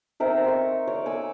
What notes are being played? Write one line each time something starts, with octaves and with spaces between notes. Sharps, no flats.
C4 D#4 A#4 E5
C6 C#6
C#5 D5
G#5 D6 E6